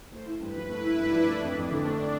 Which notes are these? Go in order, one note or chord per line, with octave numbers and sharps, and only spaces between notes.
A3 C5
E4
G2 B4
F3
A3 E4
E4
G2 D4
F3
A3 D4
F2
F2 D4
D3
A3